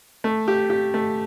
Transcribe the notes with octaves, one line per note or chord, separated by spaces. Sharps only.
A3
G4
G4
A3